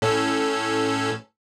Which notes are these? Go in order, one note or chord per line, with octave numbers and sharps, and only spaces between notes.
A2 C#4 A4